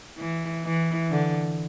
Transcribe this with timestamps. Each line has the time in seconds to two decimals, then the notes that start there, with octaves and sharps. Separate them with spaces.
0.18 E3
0.64 E3
1.11 D3